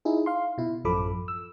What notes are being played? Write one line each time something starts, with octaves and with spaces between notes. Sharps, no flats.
D#4 E4 G#4
F5 C6
B2 E4
A1 F#2 F3 A4 B5 D6
E6